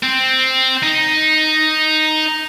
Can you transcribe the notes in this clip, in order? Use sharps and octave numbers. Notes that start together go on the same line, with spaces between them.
C4
D#4